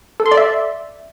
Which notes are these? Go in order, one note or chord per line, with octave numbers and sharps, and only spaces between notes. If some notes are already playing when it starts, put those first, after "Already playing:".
A4
C6
D5
E5